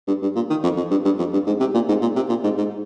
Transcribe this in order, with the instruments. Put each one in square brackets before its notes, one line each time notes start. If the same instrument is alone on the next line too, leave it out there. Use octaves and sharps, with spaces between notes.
[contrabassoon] G2
G2
A#2
D#3
F2
F2
G2
G2
F2
G2
G#2
C3
A#2
G#2
A#2
C3
A#2
G#2
G#2